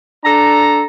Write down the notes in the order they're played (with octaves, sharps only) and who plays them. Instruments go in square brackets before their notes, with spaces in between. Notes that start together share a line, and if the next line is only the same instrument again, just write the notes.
[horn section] D4 A4 A#5